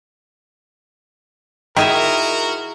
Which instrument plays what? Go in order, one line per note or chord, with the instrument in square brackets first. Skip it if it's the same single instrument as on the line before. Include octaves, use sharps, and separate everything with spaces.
[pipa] D#3 [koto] E4 G#4 E5 [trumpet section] F#4 A#4